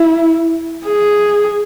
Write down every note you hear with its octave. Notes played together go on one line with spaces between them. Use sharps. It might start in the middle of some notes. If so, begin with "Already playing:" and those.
Already playing: E4
G#4